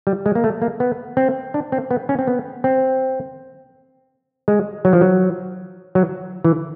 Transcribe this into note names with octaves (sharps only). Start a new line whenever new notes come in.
G3
G#3
A#3
A3
A#3
B3
C4
D4
C4
B3
C#4
C4
B3
C4
G#3
F#3
F3
F#3
F#3
E3